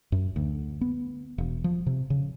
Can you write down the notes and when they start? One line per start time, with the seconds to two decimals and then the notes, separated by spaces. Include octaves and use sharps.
0.12 F#2
0.36 D2
0.81 B3
1.38 E1
1.64 F3
1.86 C3
2.10 C#3